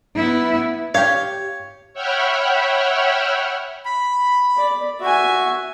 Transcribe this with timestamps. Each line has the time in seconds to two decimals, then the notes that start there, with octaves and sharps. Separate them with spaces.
0.15 B3 E4
0.94 G4 C#5 F5
1.93 C#5 E5 F#5 G5 B5 F6
3.86 B5
4.57 D5
5.01 F#4 E5 G#5